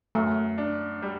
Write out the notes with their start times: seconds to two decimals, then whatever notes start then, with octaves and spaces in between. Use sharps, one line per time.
0.15 F#2 A3
0.58 D4
1.02 G3